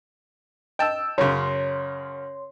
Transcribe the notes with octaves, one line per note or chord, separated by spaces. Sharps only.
D#5 G5 A5 E6
F#2 C#3 C#5 C6